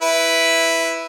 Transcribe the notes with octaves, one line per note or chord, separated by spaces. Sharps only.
E4 B4